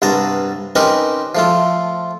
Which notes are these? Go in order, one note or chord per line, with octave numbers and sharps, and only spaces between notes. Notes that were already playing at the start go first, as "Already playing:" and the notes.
C2 G2 B3 A5 A#5
C4 C#4 D#4 G4 A#4 B4
F3 A3 F4